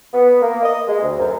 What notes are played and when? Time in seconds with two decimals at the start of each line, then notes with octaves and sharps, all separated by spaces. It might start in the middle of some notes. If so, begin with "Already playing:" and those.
0.13 B3
0.41 A#3
0.63 D#5
0.88 G#3
1.03 D2
1.19 F#2